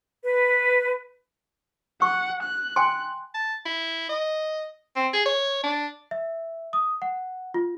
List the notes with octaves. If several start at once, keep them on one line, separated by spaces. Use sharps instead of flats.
B4
F#5 C#6
F#6
G5 G#5 C6
A5
E4
D#5
C4
G#4
C#5
D4
E5
D#6
F#5
F4